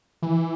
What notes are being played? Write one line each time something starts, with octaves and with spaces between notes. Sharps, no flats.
E3